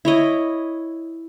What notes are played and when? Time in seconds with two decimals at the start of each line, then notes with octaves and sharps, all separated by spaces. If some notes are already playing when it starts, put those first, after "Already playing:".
0.05 E4 C#5 D#5